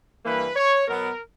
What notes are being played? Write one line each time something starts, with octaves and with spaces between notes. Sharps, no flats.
G2 E3 A#3 B4
C#5
B2 F#3 B3 A#4